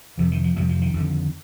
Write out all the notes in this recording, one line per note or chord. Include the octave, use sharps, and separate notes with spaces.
F2 C3 F3
D#3
F3
F2 C3 G3
F3
D#3
F2 D3